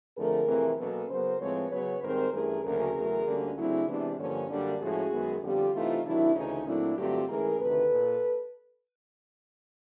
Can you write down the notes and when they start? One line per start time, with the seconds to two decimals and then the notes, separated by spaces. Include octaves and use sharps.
0.16 F2 D3 F3 A3 G#4 A#4
0.48 F2 C3 E3 A3 C4
0.78 B2 F#3 A#3 C#4 A4 B4
1.09 C#3 F#3 B3 A#4 C5
1.40 A2 F3 G#3 C4 B4 C#5
1.71 C#3 F#3 B3 B4 C#5
2.02 G#2 D#3 G3 C4 A#4 C5
2.33 G2 E3 A3 C#4 G#4 A#4
2.64 D2 C#3 F#3 A#3 C#4 G#4 A#4
2.95 E2 C#3 F#3 A3
3.27 D2 D3 G3 A#3 C#4
3.57 C#3 F#3 A3 C4 D4 E4
3.88 C3 E3 G#3 B3 D4
4.19 G2 D3 F3 A#3 C#4
4.50 F#2 D3 G3 A#3 D4
4.81 A2 F3 G#3 C#4 F#4 G#4
5.12 F#2 D#3 G#3 B3
5.43 F2 D3 G3 B3 F4 G4
5.73 C3 E3 A3 C4 D#4 F4
6.05 C3 D#3 F#3 D4 E4
6.35 D2 C#3 E3 C#4 D#4
6.66 A#2 F#3 A3 C4 D4 E4
6.97 G2 D3 F#3 A3 C4 F4 G4
7.28 G#2 E3 A3 C#4 G#4 A#4
7.59 D2 C3 D#3 A4 B4
7.91 A#2